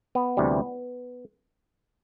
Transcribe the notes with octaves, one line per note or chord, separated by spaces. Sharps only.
B3
D2 C3 E3 G3